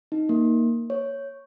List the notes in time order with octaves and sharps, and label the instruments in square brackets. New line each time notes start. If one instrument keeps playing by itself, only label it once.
[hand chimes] D#4
A#3
C#5